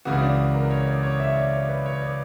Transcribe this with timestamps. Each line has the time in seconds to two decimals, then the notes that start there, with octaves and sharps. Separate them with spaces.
0.05 C#2 C#3 E3 F#4
0.22 D4
0.54 A#4
0.71 C#5
0.87 D5
1.03 C#5
1.20 E5
1.29 C#5
1.36 D5
1.53 C#5
1.69 B4
1.86 C#5
2.02 D5